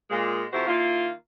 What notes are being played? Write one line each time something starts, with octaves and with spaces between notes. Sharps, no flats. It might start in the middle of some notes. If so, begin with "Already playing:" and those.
A#2 G#3
F2 C3 E4 F#4 G4 C5
D#3 A#3 E4 F4